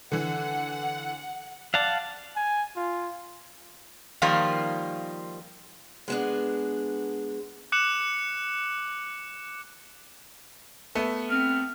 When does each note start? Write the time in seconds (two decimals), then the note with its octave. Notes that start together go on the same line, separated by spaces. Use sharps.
0.12 D3 E3 F#5
1.74 D5 F5 F#5 A5
2.36 G#5
2.76 F4
4.22 D#3 F3 G3 A#3 F4
6.08 G#3 B3 D4
7.72 D6 F#6 C#7 E7 F#7
10.95 A3 B3
11.30 C4 F6